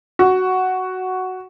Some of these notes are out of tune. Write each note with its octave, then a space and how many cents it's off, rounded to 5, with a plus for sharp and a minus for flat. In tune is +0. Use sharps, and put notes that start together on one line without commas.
F#4 +5